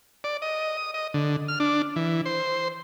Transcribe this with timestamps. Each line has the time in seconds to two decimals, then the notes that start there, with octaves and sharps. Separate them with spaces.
0.24 D5
0.42 D#5
0.77 D#6
0.94 D#5
1.14 D3
1.48 F6
1.60 D4
1.96 E3
2.25 C5